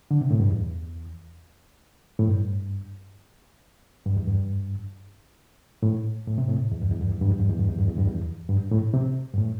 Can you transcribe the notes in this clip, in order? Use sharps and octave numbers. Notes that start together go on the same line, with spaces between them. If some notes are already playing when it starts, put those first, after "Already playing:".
D3
C3
A2
G2
E2
A2
G2
G2
E2
G2
A2
A2
C3
A2
E2
G2
E2
G2
E2
G2
E2
G2
E2
G2
E2
G2
E2
G2
E2
G2
A2
C3
G2
A2